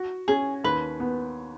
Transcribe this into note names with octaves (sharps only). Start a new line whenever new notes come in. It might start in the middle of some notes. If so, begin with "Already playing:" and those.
Already playing: F#4
C#4 G#4
D#2 B4
B3